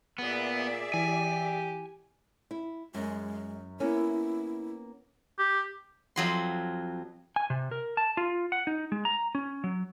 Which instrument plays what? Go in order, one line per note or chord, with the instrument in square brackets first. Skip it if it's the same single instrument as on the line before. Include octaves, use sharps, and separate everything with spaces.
[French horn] A#2 [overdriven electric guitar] B3 [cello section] G#4 D5 E5
[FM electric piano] E3 [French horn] G4 [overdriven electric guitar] G#5
[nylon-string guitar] E4
[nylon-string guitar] F#2 [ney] G#3
[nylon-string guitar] A#3 B3 C#4 [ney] E4
[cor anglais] G4
[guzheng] F2 F#3 C6
[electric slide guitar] G#5
C3
A#4
A5
F4
F#5
D#4
G#3
A#5
C#4
F#3